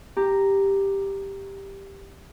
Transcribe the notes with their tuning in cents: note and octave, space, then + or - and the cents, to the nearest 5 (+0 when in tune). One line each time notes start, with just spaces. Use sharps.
G4 +5 A#5 +0